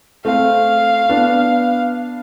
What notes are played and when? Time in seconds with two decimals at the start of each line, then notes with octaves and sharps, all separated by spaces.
0.25 A3 C4 F5
1.09 B3 D4